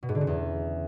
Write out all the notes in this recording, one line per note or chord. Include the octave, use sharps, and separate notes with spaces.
B2
G#2
D3
C#3
E2